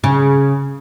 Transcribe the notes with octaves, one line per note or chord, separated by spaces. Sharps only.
C#3